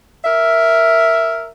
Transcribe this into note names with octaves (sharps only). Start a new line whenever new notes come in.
A#4 E5